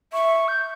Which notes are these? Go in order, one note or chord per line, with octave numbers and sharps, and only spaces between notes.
E5 C#6
G6